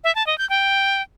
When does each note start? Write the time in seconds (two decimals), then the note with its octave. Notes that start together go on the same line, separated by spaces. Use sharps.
0.04 E5
0.15 A5
0.27 D#5
0.38 G6
0.50 G5